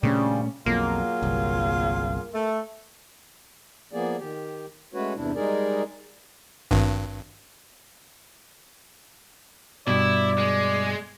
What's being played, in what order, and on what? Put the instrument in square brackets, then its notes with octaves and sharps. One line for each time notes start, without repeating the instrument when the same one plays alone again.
[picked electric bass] A#2 A3 C#4 [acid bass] C#3 [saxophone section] F3 G3 D4
[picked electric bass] B1 F2 [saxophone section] F#3 F4 G#4 [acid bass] A#3
[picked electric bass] G1 C2
[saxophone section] A3
[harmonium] F3 A#3 B3 G#4 D5
D#3 G4
G#3 A3 C#4 F#4 B4 C#5
E2 G2 C3 D4 E4
G3 G#3 D#4 G#4 A#4 D5
[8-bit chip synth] G#1 G2
[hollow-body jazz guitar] G2 B2 [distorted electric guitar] E4 [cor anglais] D5
[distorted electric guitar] G#3